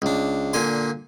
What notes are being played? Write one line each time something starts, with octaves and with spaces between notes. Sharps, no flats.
C#2 D4
A#2 D3 G#5 C6